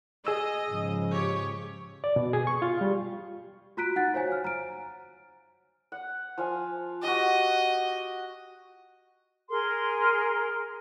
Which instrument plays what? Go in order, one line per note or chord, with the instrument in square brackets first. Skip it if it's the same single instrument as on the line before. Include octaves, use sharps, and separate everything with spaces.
[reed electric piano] G#4 E6 [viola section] D#5
[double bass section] G#2 C#3 F3
[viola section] G4 C#5
[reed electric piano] D5
B2
G#4
C#6
F4
G3
[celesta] F4 F#4 A#5 F#6 B6 D7
D#4 F#5 F#6 A6
F#4 C5 C#5 F5 G#5
F6
A#5 D7
[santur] F#5
F3 F5 G#5
[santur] F#4 G4 [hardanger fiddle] D#5
[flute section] G#4 A#4 C6